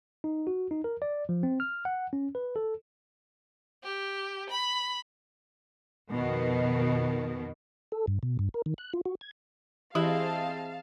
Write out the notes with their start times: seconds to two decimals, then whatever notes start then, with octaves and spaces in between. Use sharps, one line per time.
0.24 D#4
0.47 F#4
0.71 D#4
0.84 A#4
1.02 D5
1.29 F3
1.43 C4
1.60 F6
1.85 F#5
2.13 C#4
2.35 B4
2.56 A4
3.83 G4
4.49 B5
6.12 F2 B2 D#3
7.92 A4
8.07 G2
8.23 B2
8.39 G2
8.54 A#4
8.66 D#3
8.78 F#6
8.93 F4
9.06 F#4
9.21 G#6
9.95 E3 C4 E4 G4 G#4 D#5 F5 A5